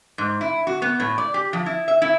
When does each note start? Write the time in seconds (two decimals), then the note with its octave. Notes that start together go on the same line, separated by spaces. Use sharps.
0.18 G#2
0.41 E4
0.67 F#4
0.82 B3
1.00 A2
1.18 D5
1.34 G4
1.53 F3
1.66 E4
1.88 E5
2.02 E4